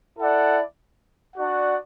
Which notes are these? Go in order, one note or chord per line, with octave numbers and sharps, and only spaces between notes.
E4 A4 D5 F#5
D4 F#4 D5 F#5